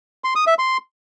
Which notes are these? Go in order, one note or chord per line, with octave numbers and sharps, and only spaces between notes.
C6
D#6
E5
C6